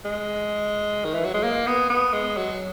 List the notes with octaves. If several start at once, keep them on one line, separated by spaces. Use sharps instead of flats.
G#3
D#3
E3
F#3
G#3
A#3
B3
B3
G#3
F#3